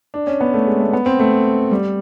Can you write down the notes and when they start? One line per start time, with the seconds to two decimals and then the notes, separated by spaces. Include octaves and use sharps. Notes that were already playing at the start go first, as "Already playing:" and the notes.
0.14 D4
0.27 C#4
0.41 B3
0.54 A3
0.67 G#3
0.80 A3
0.93 B3
1.06 C4
1.19 A3
1.71 G3